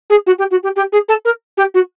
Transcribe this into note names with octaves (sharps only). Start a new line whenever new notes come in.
G#4
F#4
G4
F#4
G4
G4
G#4
A4
A#4
G4
F#4